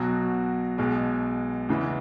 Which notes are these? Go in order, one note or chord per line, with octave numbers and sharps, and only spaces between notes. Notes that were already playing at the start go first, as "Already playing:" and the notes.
Already playing: B1 B2 F#3 F#4
B1 B2 G#3
E2 C#3 E3 G#3